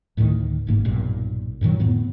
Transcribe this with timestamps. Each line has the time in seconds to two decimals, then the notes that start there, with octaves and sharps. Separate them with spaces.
0.17 D2 A2 D3 D#3
0.67 G1 G#2 A#3
0.85 B1 G2 A#2
1.61 F#2 A#2 D#3 F#3
1.80 F2 A2 D3 B3